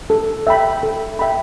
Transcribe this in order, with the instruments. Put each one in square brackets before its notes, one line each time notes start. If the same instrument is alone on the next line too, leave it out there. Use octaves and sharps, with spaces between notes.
[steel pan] A4
E5 G5 B5
A4
E5 G5 B5